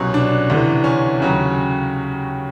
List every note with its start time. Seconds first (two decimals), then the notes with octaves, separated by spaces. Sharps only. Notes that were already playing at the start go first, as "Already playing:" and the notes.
Already playing: C2 B2 F#3 C#4
0.14 D4
0.50 D2 C3 E3
0.84 C#4
1.20 D#2 C#3 F#3